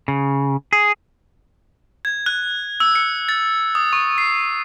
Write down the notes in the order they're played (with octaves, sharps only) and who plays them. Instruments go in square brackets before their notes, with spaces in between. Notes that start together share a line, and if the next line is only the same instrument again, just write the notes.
[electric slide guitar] C#3
G#4
[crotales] G#6
F#6
E6
C#7
A6
D#6
C#6
C7